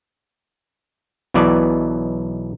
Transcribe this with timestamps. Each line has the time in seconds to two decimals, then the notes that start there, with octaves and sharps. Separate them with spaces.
1.34 B1 B2 E3 D5